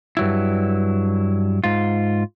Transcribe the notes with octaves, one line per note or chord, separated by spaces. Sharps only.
G2 F#3 E4
G#2 F4